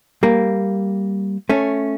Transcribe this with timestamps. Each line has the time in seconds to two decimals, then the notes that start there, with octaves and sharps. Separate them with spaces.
0.23 G3 A#3
1.49 A3 C#4